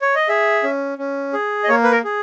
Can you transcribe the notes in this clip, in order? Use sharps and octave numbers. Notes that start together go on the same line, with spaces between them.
C#5
D#5
G#4 E5
C#4
C#4
G#4
D#5
A#3 C#5
B4
A#4
G#4